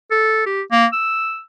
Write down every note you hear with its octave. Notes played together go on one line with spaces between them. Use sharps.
A4
G4
A#3
E6